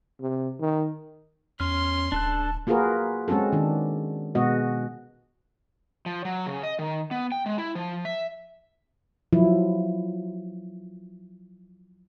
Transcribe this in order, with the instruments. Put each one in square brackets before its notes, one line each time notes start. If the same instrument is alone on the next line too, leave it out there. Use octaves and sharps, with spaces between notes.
[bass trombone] C3
D#3
[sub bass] E2 [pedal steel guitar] C#4 F6 [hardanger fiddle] C6
[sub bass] D1 [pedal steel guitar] D4 A4 F#6 [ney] A5
[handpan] A#3 F4 F#4 G#4 A#4 B4
G#3 C4 C#4 F#4 A4
D#3 D4
B2 G#3 B3 F#4 D#5
[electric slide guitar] F3
F#3
C#3
D#5
D#3
B3
G5
G#3
E4
F3
E5
[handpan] F3 F#3 E4